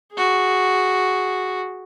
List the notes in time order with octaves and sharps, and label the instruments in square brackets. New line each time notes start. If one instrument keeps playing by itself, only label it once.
[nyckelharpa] F#4 G#4